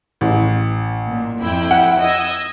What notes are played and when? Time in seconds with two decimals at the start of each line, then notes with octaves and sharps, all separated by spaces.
0.21 A1
1.07 A#2
1.40 F2 E4 G5
1.71 F#5
2.01 D#5 E6 G#6